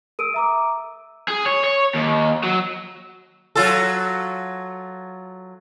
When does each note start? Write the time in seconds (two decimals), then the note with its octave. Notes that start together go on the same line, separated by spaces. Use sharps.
0.19 A#4 E6 D7 D#7
0.34 E5 A#5 D6
1.28 G#4
1.46 C#5
1.64 C#5
1.94 D#2
2.43 F#3
3.55 F#3 F4 A4